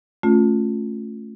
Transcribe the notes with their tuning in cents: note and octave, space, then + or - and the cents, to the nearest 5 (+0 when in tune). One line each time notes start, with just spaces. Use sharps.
A3 +0 C#4 +0 F4 +20